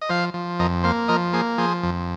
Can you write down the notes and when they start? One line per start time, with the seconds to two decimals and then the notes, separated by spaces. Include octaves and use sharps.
0.01 D#5
0.09 F3 C5 F5
0.34 F3
0.59 F2 A#4 D#5
0.83 A#3 C5 F5
1.08 F3 A#4 D#5
1.33 A#3 G#4 C5
1.58 F3 G#4 C5
1.83 F2